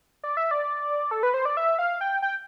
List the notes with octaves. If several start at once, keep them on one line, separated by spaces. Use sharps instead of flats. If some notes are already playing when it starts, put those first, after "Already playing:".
D5
E5
D5
A4
B4
C5
D5
E5
F5
G5
G5